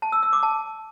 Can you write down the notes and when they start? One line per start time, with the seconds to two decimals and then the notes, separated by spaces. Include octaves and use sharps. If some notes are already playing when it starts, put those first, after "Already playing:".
0.02 A5
0.12 E6
0.23 E6
0.33 D6
0.43 A5